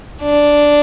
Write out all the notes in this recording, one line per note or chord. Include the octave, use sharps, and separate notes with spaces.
D4